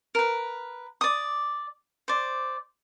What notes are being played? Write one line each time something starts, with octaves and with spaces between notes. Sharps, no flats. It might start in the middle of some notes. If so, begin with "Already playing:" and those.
A#4 B4
D5 D#6
C5 D5